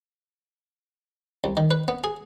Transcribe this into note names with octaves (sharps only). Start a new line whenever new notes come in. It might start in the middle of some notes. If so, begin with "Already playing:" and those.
C2
D#3
B4
B3
G#4